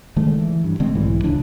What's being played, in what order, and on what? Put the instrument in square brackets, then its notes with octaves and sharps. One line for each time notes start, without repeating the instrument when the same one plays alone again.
[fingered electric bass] D3 D#3 G#3 A3
E3
G2
D3 G#3 A3 C4
B1 G#2 E3 F#3
D#1 C#2 D4